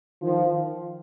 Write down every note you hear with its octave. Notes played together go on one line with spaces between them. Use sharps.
D#3 F3